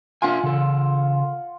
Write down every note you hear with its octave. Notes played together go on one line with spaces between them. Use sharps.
D4 F4 E5 F#5 G#5 C6
C#3 A4